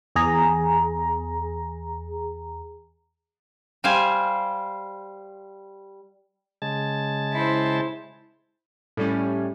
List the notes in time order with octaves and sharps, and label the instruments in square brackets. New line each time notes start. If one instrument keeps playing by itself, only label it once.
[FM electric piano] E2 G#4 A#5
[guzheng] G3 C5 F5 G#5
[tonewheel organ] C#3 G#3 A5
[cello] E4 C5
[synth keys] A2 G3 C#4